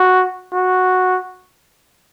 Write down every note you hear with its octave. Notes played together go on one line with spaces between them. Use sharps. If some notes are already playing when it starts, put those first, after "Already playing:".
Already playing: F#4
F#4